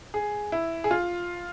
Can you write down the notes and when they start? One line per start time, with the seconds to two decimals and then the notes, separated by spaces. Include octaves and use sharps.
0.14 G#4
0.52 E4
0.84 G#4
0.91 F4